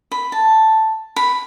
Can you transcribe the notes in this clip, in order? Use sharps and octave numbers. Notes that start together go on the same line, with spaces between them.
B5
A5
B5